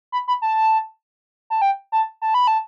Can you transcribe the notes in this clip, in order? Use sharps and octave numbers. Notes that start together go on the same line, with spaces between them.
B5
B5
A5
A5
G5
A5
A5
B5
A5